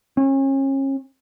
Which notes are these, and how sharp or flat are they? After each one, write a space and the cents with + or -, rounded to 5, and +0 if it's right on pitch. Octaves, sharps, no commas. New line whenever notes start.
C#4 -35